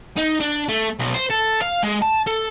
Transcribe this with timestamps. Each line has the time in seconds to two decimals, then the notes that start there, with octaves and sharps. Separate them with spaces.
0.17 D#4
0.40 D4
0.69 A3
0.99 B1
1.14 C5
1.30 A4
1.62 F5
1.83 G#3
2.02 A5
2.27 A4